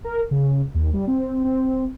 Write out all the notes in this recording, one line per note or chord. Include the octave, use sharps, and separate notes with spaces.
A#4
C#3
D#2
G3
C4
C4